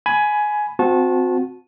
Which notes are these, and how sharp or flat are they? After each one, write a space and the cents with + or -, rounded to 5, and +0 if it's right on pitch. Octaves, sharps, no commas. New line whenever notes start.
G#5 +15 B5 +0
C4 -15 F#4 -35 A5 -20